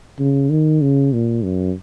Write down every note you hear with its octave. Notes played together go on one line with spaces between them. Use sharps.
C#3
D#3
C#3
A#2
F#2